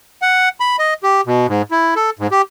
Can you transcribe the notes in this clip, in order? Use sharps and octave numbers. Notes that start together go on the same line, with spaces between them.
F#5
B5
D#5
G4
B2
G#2
E4
A4
G#2
G4